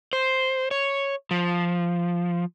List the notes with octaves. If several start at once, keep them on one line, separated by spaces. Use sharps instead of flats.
C5
C#5
F3